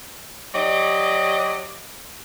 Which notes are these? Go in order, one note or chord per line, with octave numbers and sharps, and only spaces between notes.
F#3 G4 D5 D#5